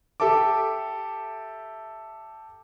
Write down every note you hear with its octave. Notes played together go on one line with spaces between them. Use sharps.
G4 A4 E5 A5 D6